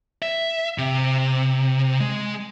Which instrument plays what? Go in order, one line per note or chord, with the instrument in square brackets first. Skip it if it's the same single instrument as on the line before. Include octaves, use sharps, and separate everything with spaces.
[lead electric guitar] E5
C3
G#3